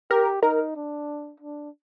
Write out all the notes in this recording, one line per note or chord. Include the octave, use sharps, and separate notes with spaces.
G4 A#4
D#4 A#4
D4
D4